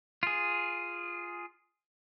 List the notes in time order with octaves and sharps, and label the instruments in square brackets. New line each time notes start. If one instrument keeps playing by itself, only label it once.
[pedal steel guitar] F4 G#4